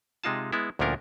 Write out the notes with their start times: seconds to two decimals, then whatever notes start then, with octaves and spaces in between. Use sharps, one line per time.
0.24 C3 G#3 D#4 F4 A5
0.53 G#3 B3 E4
0.79 D2 A#2 F3 C#4 D4 A#4